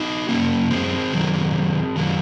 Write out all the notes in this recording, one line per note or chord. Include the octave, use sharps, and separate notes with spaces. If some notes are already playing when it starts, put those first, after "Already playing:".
Already playing: D#4 F#4
F#2 D#3 F#3 A#3 C#4
G#3 C4
F#2 D#3 F#3
F#2 D#3 F#3